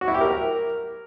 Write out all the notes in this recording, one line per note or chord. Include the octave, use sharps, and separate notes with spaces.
F#4
E4
G4
A#4